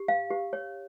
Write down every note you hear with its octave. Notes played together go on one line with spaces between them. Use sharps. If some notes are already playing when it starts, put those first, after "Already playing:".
Already playing: G4
F5
G4
C#5